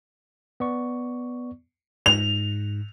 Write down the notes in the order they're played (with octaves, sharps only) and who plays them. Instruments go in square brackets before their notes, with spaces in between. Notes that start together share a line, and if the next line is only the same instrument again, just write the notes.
[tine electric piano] B3 D5 C#6
[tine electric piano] G#2 [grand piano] F7